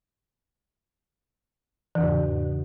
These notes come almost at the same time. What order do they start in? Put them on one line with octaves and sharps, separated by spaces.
E3 E2 C#3 G#2